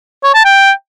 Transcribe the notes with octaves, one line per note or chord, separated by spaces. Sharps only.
C#5
A5
G5